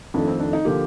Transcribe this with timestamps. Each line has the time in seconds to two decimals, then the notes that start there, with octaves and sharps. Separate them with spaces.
0.14 F2 D#3 A3 D4
0.27 C4
0.40 D4
0.53 D#4
0.65 D3 F3 A#3 G4